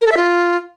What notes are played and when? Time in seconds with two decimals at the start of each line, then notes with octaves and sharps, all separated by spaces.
0.01 A#4
0.07 A4
0.12 E5
0.17 F4